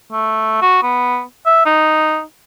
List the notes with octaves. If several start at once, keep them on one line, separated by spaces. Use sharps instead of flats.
A3
F#4
B3
E5
D#4